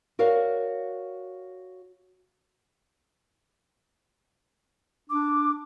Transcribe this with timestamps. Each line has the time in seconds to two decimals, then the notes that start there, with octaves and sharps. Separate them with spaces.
0.19 F#4 A#4 C#5 D5 F5
5.09 D4 D6